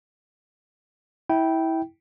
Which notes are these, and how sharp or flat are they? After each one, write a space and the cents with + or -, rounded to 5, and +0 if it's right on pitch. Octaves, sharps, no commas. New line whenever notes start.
E4 -20 G5 -10